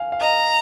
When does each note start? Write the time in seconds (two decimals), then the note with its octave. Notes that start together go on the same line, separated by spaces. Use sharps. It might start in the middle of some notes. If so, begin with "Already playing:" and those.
Already playing: F5 G#5
0.12 F5
0.21 D#5 A#5